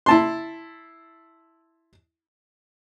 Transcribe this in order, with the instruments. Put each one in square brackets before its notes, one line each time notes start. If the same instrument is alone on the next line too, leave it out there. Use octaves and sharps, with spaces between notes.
[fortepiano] E4 A5 C6